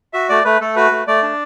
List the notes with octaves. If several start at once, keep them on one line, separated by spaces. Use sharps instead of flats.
F#4 E5
A3 D5
A3 B4
A3 A4
F#4 B4
A3
A3 D5
D4